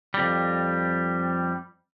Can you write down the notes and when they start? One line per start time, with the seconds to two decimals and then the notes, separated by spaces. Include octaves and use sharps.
0.14 F2 G3